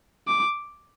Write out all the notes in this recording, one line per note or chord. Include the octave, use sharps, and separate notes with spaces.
D6